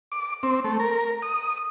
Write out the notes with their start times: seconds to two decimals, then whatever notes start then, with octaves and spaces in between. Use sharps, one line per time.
0.12 D6
0.43 C4
0.64 A3
0.80 A#4
1.22 D#6